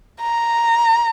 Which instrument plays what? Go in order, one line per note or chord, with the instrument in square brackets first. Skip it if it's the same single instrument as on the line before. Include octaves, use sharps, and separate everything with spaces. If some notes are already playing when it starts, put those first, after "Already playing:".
[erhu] A#5